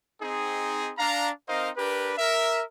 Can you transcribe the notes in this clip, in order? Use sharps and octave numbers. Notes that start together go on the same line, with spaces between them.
C4 D#4 G#4
D4 F5 A#5
C4 D#4 A#4 C5 D#5 F5
D4 G4 A#4 B4
A#4 E5